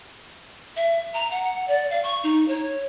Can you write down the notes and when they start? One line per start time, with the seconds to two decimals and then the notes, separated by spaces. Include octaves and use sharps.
0.76 E5
1.14 A#5
1.31 F#5
1.68 D5
1.90 F5
2.03 C#6
2.24 D#4
2.48 C#5